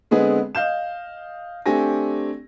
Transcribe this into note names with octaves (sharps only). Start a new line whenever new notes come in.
D3 G#3 B3 C4 G#4 B4
D#5 F5 G6 E7
A3 C4 D4 G4 G#5 A#6